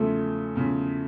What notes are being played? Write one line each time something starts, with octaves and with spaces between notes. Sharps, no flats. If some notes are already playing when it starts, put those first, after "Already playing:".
Already playing: E2 C#3 F3 A3
E2 C#3 F3